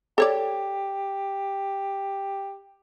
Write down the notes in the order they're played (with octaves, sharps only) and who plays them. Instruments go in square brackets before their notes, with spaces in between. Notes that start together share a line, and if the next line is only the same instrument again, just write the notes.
[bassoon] G4 [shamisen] A4 C#5 D5